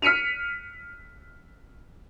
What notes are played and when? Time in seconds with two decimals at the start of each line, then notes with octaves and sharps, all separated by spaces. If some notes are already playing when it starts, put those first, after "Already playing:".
0.02 F6 B6 C#7 D#7 F7